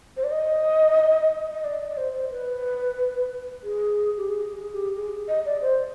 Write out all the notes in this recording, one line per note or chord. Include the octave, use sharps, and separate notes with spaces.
C5
D5
D#5
D#5
D5
D5
C5
C5
B4
G#4
G4
G#4
G#4
G4
G#4
D#5
D5
C5